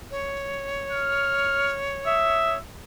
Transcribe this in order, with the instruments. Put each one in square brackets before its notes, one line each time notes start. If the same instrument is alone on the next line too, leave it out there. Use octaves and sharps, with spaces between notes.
[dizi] C#5
[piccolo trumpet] F6
[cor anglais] E5 [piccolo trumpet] D#6